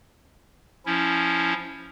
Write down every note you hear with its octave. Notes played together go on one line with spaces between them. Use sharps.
F3 C#4 E4